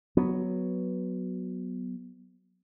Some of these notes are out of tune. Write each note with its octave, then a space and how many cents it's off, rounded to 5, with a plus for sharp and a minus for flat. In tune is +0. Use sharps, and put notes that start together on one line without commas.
F#3 +0 B3 +0